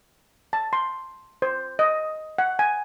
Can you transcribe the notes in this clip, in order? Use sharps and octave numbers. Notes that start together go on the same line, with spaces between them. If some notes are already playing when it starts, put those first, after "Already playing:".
A5
C6
C5
D#5
F#5
G#5